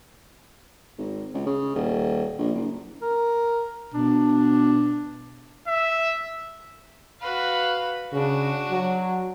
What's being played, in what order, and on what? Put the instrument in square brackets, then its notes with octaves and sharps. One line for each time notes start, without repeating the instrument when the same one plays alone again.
[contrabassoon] G#1
C#2
C#3
D#1
A#1
F#1
[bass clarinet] A#4
[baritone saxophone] B2 [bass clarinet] D4
[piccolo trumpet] E5
[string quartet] F#4 B4 F5
[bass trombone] C#3 [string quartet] D4 F#4
[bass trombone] F#3